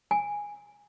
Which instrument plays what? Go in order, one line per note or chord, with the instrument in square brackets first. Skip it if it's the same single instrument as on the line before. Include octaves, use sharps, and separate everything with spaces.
[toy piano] G#5